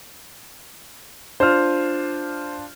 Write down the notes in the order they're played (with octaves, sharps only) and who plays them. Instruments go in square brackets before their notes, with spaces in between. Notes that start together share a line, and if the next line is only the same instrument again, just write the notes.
[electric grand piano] D4 F4 [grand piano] C5 F6